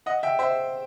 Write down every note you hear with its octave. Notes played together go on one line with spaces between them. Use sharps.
D#5 F#5
E5 G5
C5 E5